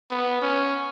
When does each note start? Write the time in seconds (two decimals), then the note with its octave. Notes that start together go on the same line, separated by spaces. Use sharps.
0.11 B3
0.42 C#4